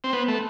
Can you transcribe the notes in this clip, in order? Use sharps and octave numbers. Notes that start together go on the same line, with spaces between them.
C4
B3
A3